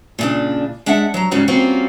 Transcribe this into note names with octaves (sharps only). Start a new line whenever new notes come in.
A#2 C#3 D4
G#3 D4 E5 F#5
F#3 A#5
G#2 C#3 G3 C#4 F#4
G3 A#3 C4 C#4 F4 F#4